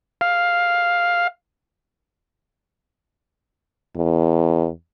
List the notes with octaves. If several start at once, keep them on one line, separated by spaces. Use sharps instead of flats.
F5
E2